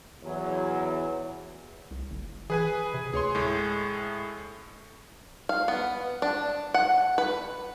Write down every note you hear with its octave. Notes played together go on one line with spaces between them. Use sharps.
E2 F#3
C2
F#1
E3 G#4 B4 G#5
C3
D2 G#4 C#5 C6
A2 G#3 A3
F5
B3
D4
F#5
B4